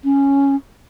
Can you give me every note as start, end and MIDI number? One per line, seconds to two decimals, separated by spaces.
0.04 0.56 61